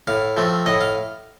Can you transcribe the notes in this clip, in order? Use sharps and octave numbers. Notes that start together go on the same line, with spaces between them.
A2 F5
F3 A3 C4
A2 D#5
F5